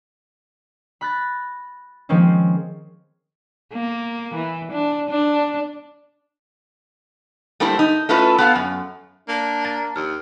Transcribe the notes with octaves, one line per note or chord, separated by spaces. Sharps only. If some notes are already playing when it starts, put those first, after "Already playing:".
B5 F#6 A6 A#6
D#3 F3 G#3 A#3 C4 C#4
A#3
E3
D4
D4
G3 A3 A#3 C4 E4
D#4
A3 C#4 E4 F4 B4
B3 A4 F5
F#2
A#3 D4
A5 A#5 A6
D#2 E6 F6